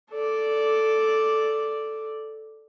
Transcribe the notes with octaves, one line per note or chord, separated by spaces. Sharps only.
A4 D5